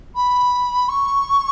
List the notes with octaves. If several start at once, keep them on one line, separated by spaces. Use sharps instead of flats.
B5
C#6